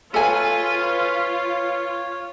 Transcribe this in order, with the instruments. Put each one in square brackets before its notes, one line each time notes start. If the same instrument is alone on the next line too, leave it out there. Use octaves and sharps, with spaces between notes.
[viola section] F4 [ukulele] A4 G#5 [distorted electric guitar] B4 [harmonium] C#5